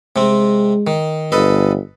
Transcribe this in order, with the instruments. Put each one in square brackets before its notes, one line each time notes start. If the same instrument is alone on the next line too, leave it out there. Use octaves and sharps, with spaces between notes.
[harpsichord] C3 C4 [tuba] G#3
[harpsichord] D#3
[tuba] G1 [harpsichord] A4 B4 D#5